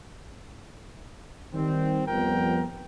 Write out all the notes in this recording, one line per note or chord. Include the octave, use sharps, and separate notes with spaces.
D#3 G3 C4
F2 F3 G3 B3 A#4 G5